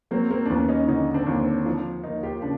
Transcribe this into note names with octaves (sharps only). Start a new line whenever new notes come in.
F#3 A#3 C4
A#3 C4
D4
D#2 B3 C#4
C#4 D#4
D3 C#4 D#4
C4 D4
D#2
C4 D4
F3 C4 D4
A#3 D#4 F4
F4 G4
C#3 D4